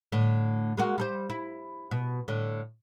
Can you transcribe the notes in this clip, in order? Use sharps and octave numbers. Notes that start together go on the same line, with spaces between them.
A2 D3
G#3 A#3 F#4
G3 A4 C5
E4
B2
A2 D3